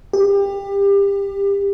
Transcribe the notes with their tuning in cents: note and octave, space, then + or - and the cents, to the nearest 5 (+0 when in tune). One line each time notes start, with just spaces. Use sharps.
G4 +25